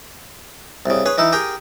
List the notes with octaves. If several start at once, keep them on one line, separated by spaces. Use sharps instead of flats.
C2 C#3
G#4 B4 C#5
E3 D#4 E4
G4 G#4 A#4 G5 G#5